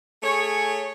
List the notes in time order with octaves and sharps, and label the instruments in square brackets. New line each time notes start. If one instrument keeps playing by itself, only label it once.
[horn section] A3 G#4 C#5